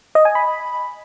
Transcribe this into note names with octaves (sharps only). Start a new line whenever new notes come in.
D#5
G#5
B5